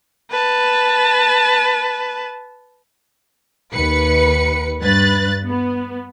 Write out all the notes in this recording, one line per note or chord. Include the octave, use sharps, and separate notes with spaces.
B4 A5
D#2 B4 C#7
G2 B4 F#6 A6
B3